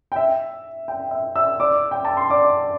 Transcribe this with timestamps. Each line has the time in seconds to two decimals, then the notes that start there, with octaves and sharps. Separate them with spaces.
0.12 G5
0.16 E5
0.88 G5
1.11 E5
1.36 E5 E6
1.60 D5 D6
1.91 G5
2.05 A5
2.17 C6
2.30 D5 D6